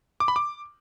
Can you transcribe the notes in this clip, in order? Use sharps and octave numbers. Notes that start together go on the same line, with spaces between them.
D6
B5
D6